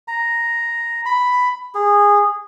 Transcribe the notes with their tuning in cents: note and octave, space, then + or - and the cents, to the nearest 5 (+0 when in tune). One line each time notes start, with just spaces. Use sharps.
A#5 +0
B5 +5
G#4 -20